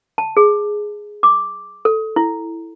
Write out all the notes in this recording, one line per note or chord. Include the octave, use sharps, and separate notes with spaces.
A5
G#4
D6
A4
E4